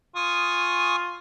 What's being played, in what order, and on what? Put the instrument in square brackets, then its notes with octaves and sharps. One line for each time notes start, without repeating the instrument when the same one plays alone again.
[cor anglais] F4 [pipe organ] G#5 C#6 D#6